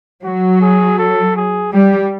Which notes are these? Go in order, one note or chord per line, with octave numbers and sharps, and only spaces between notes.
F#3 F#4
G#4
A4
G#4
G3 G4